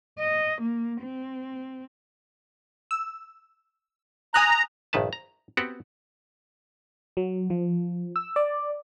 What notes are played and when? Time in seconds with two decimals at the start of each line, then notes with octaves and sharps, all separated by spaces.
0.19 D#5
0.62 A#3
1.02 C4
2.91 E6
4.34 G#5 A#5 D#6 F#6
4.93 A#1 G2 D#3 B4 A5
5.13 A#5
5.57 B3 C4 F#4 G4 F#5
7.17 F#3
7.50 F3
8.16 E6
8.36 D5